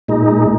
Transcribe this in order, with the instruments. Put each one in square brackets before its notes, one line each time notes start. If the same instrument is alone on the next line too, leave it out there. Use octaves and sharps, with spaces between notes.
[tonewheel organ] A#2 G#3 D#4